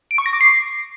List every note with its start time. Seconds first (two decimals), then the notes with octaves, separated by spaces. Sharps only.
0.11 D7
0.18 C#6
0.26 A#6
0.33 D6
0.41 C7